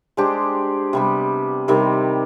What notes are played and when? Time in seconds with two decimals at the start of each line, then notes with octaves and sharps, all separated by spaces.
0.17 G#3 D4 G4 C5
0.93 C3 G3 B3
1.68 C3 D#3 G3 C4